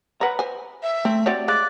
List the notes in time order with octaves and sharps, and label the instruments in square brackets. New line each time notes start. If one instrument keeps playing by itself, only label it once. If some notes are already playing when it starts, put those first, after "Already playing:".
[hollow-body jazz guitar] B4 A#5 [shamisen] C#5 F#5
[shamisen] C5 G#5
[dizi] E5
[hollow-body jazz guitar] A3 [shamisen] C4
[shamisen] C4 F#4 C#5 [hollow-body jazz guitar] G4 D5
[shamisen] G#3 [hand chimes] F5 F#6 A6 [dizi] D6